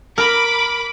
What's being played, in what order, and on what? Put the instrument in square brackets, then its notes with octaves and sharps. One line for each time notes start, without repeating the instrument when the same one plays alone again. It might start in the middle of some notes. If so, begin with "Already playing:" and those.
[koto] A#4 [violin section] B5 D6